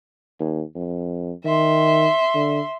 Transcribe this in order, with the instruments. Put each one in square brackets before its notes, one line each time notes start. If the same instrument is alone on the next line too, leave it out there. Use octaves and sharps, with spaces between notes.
[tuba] D#2
F2
[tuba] D#3 [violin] E5 C6
[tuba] D3